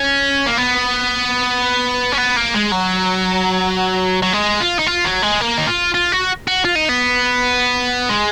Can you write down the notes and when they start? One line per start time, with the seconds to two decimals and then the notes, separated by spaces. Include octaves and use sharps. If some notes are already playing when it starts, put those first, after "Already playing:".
Already playing: C#4
0.46 A#3
0.57 B3
2.12 C#4
2.17 B3
2.36 A#3
2.54 G#3
2.71 F#3
4.22 F#3
4.33 G#3
4.60 F4
4.79 D#4
4.87 F4
5.05 F#3
5.23 G#3
5.41 A#3
5.58 D#4
5.68 F4
5.94 F4
6.12 F#4
6.48 F#4
6.65 F4
6.75 D#4
6.89 B3
8.09 G#3